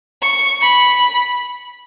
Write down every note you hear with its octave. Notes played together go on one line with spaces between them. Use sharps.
C#6
B5